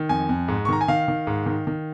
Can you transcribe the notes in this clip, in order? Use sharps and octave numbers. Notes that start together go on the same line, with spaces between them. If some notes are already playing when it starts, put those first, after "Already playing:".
Already playing: D#3
F2 G#5
F2
G#2
C#6
D#3 A#5
G#5
D#3 F5
D#3
G#2
D#3
D#3